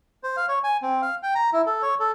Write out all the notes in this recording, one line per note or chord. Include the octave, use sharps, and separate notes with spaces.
C5
F5
C#5
G#5
C4
F5
G5
A#5
E4
A4
C#5
A4